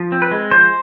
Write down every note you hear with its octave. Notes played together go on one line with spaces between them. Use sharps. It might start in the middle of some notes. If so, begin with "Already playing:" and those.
Already playing: F3
C4
B4
G#3
F3 C5